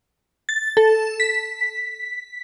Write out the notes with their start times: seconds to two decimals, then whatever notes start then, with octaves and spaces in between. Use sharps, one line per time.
0.49 A6
0.77 A4
1.20 B6